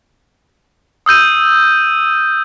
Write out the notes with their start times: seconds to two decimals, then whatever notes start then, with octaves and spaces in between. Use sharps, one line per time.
1.06 D#6 E6 G6 D#7